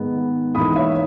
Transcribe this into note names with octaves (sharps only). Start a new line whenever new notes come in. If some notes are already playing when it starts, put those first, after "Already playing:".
Already playing: G#2 D#3 G#3 B3
G#2 E3 A#3 B5 D#6
C#5 E5